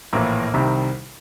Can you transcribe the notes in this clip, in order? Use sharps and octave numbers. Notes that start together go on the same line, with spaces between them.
A#1 A2 E3 A#3
C2 C3 D#3 G3